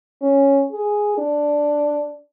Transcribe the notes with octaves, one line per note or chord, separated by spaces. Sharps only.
C#4
G#4
D4